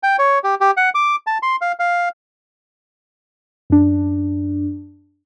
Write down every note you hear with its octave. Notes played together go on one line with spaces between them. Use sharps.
G5
C#5
G4
G4
F#5
D6
A5
C6
F5
F5
F#2 D4